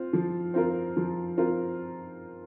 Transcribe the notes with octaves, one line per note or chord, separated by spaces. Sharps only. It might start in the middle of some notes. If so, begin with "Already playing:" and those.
Already playing: C4 F4
F3
C4 F4 A#4
F3
C4 F4 A#4